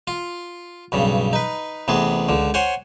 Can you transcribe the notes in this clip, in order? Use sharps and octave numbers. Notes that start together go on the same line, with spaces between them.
F4
B1 G2 C#3
D#4 B4
A1 C3 B3 G#4
C#2 D3
C5 C#5 F#5 G#5